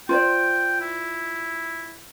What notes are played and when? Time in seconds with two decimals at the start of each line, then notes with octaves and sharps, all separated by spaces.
0.09 F4 C5 D5 G5
0.81 E4